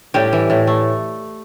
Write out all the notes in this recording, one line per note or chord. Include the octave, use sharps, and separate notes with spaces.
A2 G3 G4
E3
A2
A3